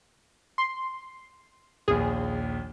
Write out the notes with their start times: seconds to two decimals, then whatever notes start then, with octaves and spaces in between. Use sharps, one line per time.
0.58 C6
1.88 A#1 D#2 G#4